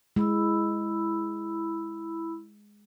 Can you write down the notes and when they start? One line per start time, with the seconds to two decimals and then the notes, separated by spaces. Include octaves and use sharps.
0.16 G#3 E4 B5 E6